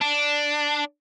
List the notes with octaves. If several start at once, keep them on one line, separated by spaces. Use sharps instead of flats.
D4